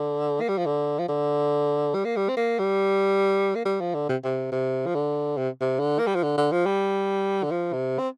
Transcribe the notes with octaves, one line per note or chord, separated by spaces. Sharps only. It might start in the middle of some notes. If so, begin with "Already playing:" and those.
Already playing: D3
A#3
G3
F3
D3
F3
D3
G3
A#3
G3
C4
A#3
G3
A#3
G3
F3
D3
C3
C3
C3
F3
D3
C3
C3
D3
A#3
G3
F3
D3
D3
F3
G3
D3
F3
C3
C4